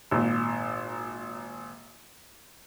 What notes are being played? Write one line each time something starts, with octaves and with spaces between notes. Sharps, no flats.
G#1 A#2